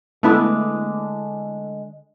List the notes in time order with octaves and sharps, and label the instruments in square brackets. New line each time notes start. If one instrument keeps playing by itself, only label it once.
[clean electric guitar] D3 G#3 D4 [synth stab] A3 B3 E4